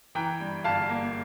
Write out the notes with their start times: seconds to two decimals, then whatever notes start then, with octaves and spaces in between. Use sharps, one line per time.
0.15 E3 G5 A#5
0.40 G2
0.64 G1 F5 A5
0.89 A#3